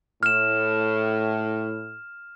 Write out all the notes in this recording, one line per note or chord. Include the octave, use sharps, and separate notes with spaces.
A2 F6 E7